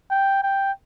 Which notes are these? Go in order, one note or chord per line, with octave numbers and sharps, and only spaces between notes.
G5
G5